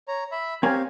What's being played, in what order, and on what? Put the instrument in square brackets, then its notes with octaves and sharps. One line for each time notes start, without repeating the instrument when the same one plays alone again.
[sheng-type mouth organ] C#5 A#5
E5 B5
[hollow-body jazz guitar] C4 A#4 G#5 [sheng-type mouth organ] G4 C#5 F5